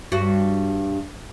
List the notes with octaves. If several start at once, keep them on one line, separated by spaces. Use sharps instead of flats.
G2 F#4